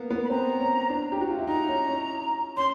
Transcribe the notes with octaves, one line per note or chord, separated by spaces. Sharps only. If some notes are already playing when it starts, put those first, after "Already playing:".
Already playing: A#3 B3
B3
B5
C4 A#5
C#4
D4
G4
F#4
F4
E4
D#4 A#5
C#4
C#4
C#4 C6